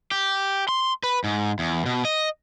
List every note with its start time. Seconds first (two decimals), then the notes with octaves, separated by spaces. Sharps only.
0.11 G4
0.69 C6
1.03 B4
1.24 G#2
1.59 E2
1.86 B2
2.05 D#5